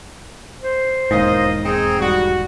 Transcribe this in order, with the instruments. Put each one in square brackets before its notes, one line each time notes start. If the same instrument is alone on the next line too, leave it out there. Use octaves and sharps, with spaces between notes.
[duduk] C5
[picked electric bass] E1 D#2 G#2 [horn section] F4 A#4 D#5
[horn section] C4 D#4 [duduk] G#4
[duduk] G3 [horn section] F#4